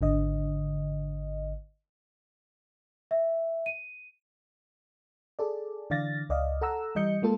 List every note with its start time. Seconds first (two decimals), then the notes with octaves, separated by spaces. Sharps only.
0.01 G#1 D3 D#5
3.11 E5
3.66 D#7
5.39 G#4 A4 D5
5.90 D3 E3 D5 F5 A6 A#6
6.29 C#2 D5 D#5 F5
6.61 A4 F#5 A#5 E6
6.95 E3 G3 D#5 G6 C#7
7.22 G#3 A#3 F4 A4